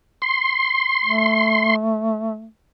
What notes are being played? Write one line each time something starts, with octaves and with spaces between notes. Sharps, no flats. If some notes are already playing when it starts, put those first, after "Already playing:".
C6
A3